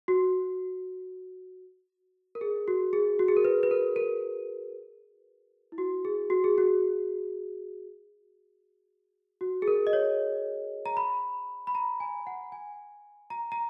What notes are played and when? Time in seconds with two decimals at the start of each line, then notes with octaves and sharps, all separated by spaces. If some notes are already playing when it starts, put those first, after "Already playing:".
0.08 F#4
2.35 A#4
2.41 G#4
2.68 F#4
2.93 G#4
3.19 F#4
3.28 G#4
3.37 A#4
3.45 B4
3.63 B4
3.71 A#4
3.96 A#4
5.72 E4
5.78 F#4
6.05 G#4
6.30 F#4
6.44 G#4
6.58 F#4
9.41 F#4
9.62 G#4
9.68 A#4
9.87 D#5
9.93 C#5
10.86 A#5
10.97 B5
11.67 B5
11.75 A#5
12.00 G#5
12.27 F#5
12.52 G#5
13.30 A#5
13.52 A#5